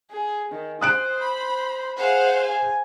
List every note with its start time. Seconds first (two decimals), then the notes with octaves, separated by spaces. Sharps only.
0.11 G#4
0.52 D#3
0.81 C5 D#6 F#6 D7
1.20 B5
1.99 G#4 C5 F5 F#5
2.42 G#5